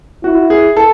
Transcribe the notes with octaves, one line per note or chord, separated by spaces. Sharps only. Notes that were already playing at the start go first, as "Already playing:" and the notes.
E4 F#4
G#4
A4